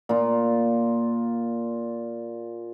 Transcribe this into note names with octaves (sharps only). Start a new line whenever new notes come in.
A#2 F4